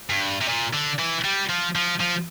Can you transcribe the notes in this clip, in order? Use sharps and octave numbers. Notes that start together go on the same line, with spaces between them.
G2
C3
A#2
D3
E3
G3
F3
F3
F3